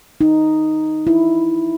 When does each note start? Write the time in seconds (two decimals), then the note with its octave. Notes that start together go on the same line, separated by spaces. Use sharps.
0.21 D#4
1.07 E4